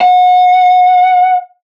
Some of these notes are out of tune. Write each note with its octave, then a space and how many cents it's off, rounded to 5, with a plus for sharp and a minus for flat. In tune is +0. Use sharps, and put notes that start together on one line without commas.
F#5 -30